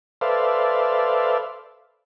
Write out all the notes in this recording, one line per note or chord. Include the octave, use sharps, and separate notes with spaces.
A4 B4 C5 D5 E5 F5